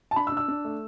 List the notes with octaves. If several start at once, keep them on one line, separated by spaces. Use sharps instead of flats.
A5
D4 B5
E6
D4
E6
D4
A3